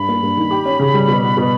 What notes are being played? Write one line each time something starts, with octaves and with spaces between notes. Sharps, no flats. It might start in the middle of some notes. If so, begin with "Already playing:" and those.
Already playing: G2 B5
A#3
G2
D#3
G4
C#4
C#3
G3
B2
B3
B2